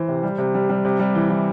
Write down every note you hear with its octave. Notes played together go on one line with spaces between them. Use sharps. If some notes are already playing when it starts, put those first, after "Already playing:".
Already playing: E3 C5
C3
G3
C3
G3
G3
C3
G3
E3
E3